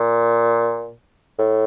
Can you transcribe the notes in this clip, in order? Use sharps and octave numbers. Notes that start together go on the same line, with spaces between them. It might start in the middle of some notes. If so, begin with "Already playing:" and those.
Already playing: A#2
A2